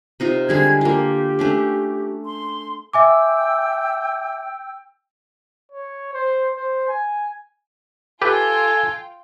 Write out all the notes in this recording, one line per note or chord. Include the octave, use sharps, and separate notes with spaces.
C3 D#4 F4
D3 G3 G#3 G#6
A#3 F4 G4
A3 C#4 D4
C6
E5 G5 G#5 D6 E6
C#5
C5
C5
G#5
F4 G4 A4 B4 G5 G#5